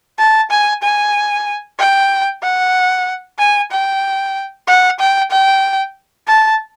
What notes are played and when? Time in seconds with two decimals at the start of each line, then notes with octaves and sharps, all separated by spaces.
0.18 A5
0.51 G#5
0.83 G#5
1.79 G5
2.43 F#5
3.38 G#5
3.72 G5
4.68 F#5
4.99 G5
5.31 G5
6.27 A5